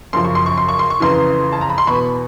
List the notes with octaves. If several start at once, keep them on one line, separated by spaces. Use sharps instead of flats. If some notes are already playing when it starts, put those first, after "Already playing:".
F#2 C#3 F3 C6
C#6
C6
C#6
C6
C#6
C6
C#6
F2 C#3 E3 A#5 C6
A5
A#5
B5
C6
E2 B2 B5 C#6